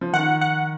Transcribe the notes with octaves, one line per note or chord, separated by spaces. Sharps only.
F3
D#3 F#5
F#5